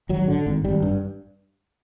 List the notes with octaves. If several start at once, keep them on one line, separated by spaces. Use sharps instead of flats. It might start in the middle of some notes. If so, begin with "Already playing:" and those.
G#1 F#3
D3
G#1
G#1 G3
G2